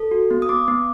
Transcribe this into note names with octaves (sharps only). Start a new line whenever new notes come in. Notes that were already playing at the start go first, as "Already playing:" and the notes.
Already playing: A4
F#4
B3
D#6
B3 D6
B3